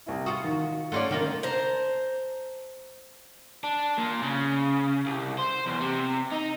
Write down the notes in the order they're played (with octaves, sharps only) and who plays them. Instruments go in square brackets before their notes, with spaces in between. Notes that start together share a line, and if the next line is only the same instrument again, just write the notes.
[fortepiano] C2 E4
[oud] F4 F#4 [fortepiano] D#6
[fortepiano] D#3
[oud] A3 C#4 D5 [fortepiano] F#5 C6
[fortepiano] D3 C#4 [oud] D#3 A#3 F4
[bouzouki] C5 A5 A#5
[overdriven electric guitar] D4
A#2
C#3
C2
C5
E2
C3
D#4